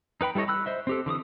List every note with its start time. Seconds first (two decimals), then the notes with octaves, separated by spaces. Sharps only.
0.21 D#4 B4 G5 B5
0.35 G3 E4 A4 C#5 D#5
0.48 B5 E6 F#6
0.66 C5 D#5 E5
0.87 C4 G4 A4
1.06 D3 E3 D6 D#6